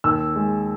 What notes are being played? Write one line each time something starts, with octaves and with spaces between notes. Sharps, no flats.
D#2 E6
G#3